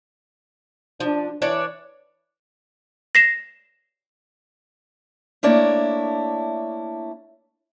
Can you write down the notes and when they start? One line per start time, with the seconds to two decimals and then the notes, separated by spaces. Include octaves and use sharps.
1.00 F3 D4
1.42 E3 D4 C#5 D5
3.15 A#6 C7 E7
5.43 A3 A#3 D4 E4 C#5